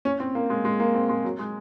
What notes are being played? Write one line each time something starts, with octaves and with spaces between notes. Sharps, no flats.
C#4
C4
A#3
G#3
G#3
A#3
C4
G#3
F#3
G#3